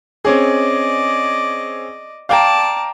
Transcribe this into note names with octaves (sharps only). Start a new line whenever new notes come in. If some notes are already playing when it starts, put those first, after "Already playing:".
C4 C#4 G#4 D5 D#5
D5 F5 G5 A5 A#5